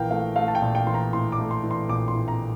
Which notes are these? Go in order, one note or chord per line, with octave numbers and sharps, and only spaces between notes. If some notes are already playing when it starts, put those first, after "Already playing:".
Already playing: A#1 E3 A#4 F5 G5
A3 F5
A3 F5
A5
G5
A#1
G5
E3 C6
A#5
A2 C6
D6
A3
C6
E3
C6
A#1 D6
C6
A2
A#5